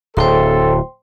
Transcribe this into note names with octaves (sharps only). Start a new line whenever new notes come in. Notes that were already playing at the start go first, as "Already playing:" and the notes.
D1 A4 C5 G5 C6